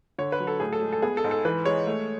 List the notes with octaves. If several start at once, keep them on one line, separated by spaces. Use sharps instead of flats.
D3 C#5
B4
F#3
A4
A2 G#4
A4
G#3
A4
B3 G#4
A4
G#2
A4
E3 B4
G#3 C#5
A3